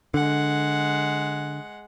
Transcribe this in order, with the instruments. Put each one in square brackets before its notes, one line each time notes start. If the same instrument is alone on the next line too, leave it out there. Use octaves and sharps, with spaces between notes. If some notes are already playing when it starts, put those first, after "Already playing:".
[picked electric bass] D3 [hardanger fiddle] G#3 F#5